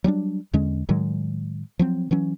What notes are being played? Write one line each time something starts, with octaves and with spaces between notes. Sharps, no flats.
F#3 G3 A#3 D4
E2 D3 G#3 C#4
A2 D#3 F#3 G#3
F3 F#3 C4
E3 F#3 C#4